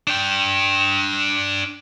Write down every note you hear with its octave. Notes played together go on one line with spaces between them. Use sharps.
D4 G5